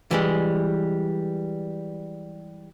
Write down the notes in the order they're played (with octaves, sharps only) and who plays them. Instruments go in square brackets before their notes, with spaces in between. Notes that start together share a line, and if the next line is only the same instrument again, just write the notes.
[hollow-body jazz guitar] E3 G3 G#3